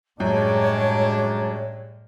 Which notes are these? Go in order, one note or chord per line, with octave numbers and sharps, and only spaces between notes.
F#2 A2 G3 G#3 D4 C#5